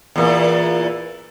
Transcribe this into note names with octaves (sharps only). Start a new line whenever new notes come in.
E2 A#2 E3